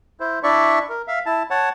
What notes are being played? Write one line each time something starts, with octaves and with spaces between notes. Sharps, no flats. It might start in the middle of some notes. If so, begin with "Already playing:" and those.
E4 C5
D4 E4 D5 E5 C#6
A#4
E5 F5
E4 A5
C#5 F#5 A5